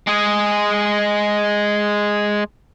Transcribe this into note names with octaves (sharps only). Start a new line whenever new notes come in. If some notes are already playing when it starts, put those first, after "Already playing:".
G#3 G#4